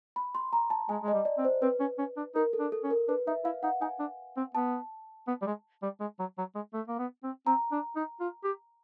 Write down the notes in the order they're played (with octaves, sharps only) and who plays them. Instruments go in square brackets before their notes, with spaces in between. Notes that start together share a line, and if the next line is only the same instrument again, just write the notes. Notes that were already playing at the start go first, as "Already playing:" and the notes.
[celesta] B5
C6
A#5
A5
[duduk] G#3 [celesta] G#5
[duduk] G#3
[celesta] D#5
[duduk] G3
[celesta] D5
[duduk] C4
[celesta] C5
[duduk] C4 [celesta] B4
[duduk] C#4
C#4
D4
[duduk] D#4 [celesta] A#4
[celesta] A4
[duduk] D4
[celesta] A4
[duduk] C#4
[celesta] A#4
[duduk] D4 [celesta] B4
[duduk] D#4 [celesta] E5
[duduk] E4 [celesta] F5
[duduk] D#4 [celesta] F#5
[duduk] D#4 [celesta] G#5
[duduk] D4
C4
[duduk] B3 [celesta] A5
[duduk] B3
G3
G#3
G3
G#3
F#3
F#3
G#3
A3
A#3
B3
C4
[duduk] C4 [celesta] A#5
[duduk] D4
D#4
F4
G4